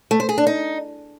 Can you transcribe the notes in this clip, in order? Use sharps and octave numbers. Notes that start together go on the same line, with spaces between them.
A3
C5
G#4
D4
D#4